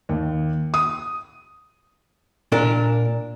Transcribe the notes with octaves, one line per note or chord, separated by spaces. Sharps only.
D#2
D#6
A#2 D4 A#4